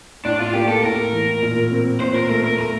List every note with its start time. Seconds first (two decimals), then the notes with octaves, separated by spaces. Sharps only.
0.25 A2 D4
0.39 F4
0.54 A#3 G4
0.68 A4
0.83 A2 A#4
1.13 E3
1.42 A#2
1.71 C4
2.00 A#2 C5
2.16 A#4
2.30 A3 A#4
2.44 A#4
2.59 A3 A#4